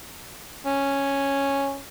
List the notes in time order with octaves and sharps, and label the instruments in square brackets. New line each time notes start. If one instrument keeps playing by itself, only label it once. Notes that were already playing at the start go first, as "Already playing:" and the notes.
[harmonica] C#4